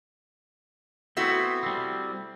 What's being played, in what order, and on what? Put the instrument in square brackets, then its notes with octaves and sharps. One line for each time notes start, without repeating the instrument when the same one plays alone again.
[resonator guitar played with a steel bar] A3 E4 F#4 [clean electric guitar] B3 C4
[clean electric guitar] G3 C4